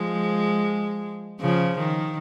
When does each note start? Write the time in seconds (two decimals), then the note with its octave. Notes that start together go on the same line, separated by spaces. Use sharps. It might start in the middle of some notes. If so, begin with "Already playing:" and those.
Already playing: F3 G#3
1.41 C#3 F3
1.78 D#3